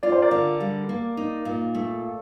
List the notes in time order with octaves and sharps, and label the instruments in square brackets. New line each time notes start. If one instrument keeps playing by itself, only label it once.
[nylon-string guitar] F4 [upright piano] D5
[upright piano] C5
A#4 D5
[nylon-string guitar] D3
G3
A#3
D#4
A#2
A3